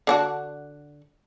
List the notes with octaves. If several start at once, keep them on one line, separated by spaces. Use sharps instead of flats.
D3 D4 F#4